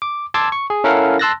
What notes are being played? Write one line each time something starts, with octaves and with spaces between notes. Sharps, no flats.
D6
A5 C6 D6 E6 G#6
C#6
G#4
C#4 E4 A4 A#4 F5 F#5
A5 C6 E6 F#6 A6 A#6